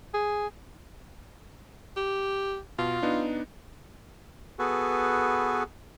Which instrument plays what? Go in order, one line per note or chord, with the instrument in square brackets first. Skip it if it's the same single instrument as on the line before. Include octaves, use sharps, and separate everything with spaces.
[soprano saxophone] G#4
[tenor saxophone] G4
[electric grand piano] B2 [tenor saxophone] F4
[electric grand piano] B3 D4 D#4
[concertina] B3 F#4 G#4 A4 B4